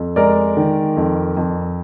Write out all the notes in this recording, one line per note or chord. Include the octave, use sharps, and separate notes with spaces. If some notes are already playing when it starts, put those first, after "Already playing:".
Already playing: F2
G#3 A#4 D5
D#3
F2
F2